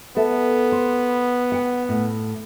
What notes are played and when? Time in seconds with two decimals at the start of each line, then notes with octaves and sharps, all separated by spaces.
0.17 B3 A4 E5
0.72 C5
1.52 F#5 G5
1.89 A2